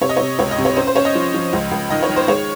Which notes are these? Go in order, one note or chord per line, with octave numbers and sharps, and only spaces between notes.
C3 C#5
D#5
C3 C#5
C#2 C#5
D#5
C3
C#5
C#4 C5
C5
C#4 C#5
D#5
F3
F3
C#2
C#2
D#3 D#5
C#5
D#3
C5
G#3 C#5